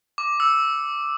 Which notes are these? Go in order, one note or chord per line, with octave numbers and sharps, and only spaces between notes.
D6
E6